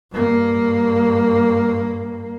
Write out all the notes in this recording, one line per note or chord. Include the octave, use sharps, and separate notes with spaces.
G2 A#3